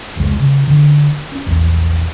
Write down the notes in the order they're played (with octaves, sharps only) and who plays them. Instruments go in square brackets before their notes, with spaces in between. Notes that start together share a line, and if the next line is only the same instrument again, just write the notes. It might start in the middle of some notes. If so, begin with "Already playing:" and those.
[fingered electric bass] F1 C#2 C3 G#3
C#3
D3
C#4
A#1 E2